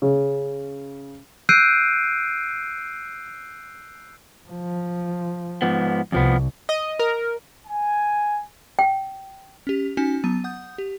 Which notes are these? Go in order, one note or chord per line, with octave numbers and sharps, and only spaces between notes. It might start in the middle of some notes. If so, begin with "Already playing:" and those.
C#3
E6 F#6 G6 C7 D7 D#7
F3
G#2 F3 B3
C2 F2 F3 B3
D#5
A#4
G#5
G5
C#4 G4
C#4 D#4 F#4 G#5
F#3 B3 A5 A6 D#7
F#5 D#6 G6
G4